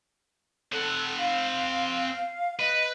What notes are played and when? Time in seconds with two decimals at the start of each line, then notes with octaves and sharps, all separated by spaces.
0.73 C4 A4 F#5
1.18 F5
2.60 B4 D#5